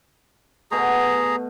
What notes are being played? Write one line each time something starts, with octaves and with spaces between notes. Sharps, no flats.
B2 A3 G#4 A#5